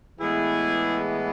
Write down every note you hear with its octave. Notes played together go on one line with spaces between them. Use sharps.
A2 E3 G#3 B3 E4 G#4